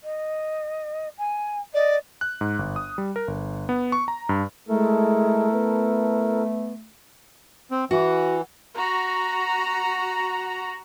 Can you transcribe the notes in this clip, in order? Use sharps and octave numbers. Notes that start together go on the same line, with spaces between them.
D#5
G#5
D5 D#5
F#6
G#2
G1
D#6
G3
A#4
G1
B3
C#6
A#5
G2
G#3 A3 E4 A4 A#4
B3
C4
E3 F#4
F#4 A#5